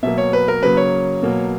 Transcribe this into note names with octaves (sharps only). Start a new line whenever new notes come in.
B2 F#3 A#3 E5
C#5
B4
A#4
C#3 F#3 A#3 B4
C#5
B2 F#3 A#3